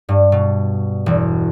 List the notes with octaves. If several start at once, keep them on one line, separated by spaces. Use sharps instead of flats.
G2
B2
E1